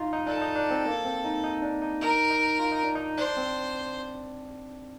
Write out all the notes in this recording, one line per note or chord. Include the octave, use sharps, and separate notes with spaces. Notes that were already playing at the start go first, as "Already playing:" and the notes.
Already playing: D#4 F4
D#4
D4 A4
D#4
D4
C4
A#3
C4
D#4
D#4
D4
D#4
D#4 A#4
D#4
F4
D#4
D4
D#4
D4 C5
C4